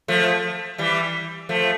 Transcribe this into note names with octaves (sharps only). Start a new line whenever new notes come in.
F3 A3
E3 G3
F3 A3